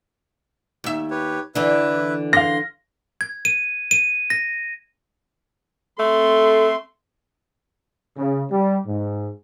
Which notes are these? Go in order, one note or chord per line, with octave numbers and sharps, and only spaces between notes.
D#2 E5
G4 B4 C#5
D3 E3 D4 E4 B4
F5 C6 A#6
G#6
D#7
D#7
A#6
A3 C4 A4 C6
C#3
G3
G#2